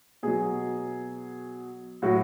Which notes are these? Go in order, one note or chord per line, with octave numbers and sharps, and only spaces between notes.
B2 F#3 G#4
A2 F#3 F#4